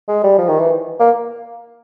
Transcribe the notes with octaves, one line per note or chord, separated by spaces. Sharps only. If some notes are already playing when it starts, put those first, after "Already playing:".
G#3
G3
F3
D#3
E3
A#3